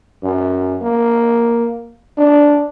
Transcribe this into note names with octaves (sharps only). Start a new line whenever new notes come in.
F#2
A#3
D4